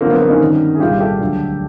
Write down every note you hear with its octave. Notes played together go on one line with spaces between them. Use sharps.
F#2 D3 F3 A#3 C4
B3
A#3
C#4 D#4
G2 D#3 G3
G#4
C2 A#2 G3 F4 G4
G4 A4
D2 D3 F#3